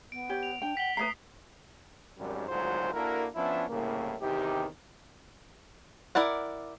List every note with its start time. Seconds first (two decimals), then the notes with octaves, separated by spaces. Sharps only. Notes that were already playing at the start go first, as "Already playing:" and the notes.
0.12 B3 D7
0.29 G4 C#5
0.43 F7
0.62 D4 G5
0.77 F#5 B6 F#7 G7
0.97 A3 B4 C#5 A#5 D#6 C7
2.18 G#1 F#2 G3
2.48 G#1 D2 G#2 F#3 F4 C5
2.93 A#3 D4 E4 F#4 A4 A#4
3.35 F3 B3 C#4 D4 E4
3.69 C2 A2 C#3 A#3
4.21 E2 C3 D#3 D#4 G4
6.15 E4 A#4 D5 F#5